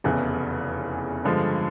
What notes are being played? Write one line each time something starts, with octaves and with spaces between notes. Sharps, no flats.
F1 E2 C#3 E3
G2 D3 F3 G#3